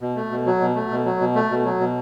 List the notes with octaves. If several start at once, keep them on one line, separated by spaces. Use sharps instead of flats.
B2
A3
B2
F#3
B2
A3
B2
F#3
B2
A3
B2
F#3
B2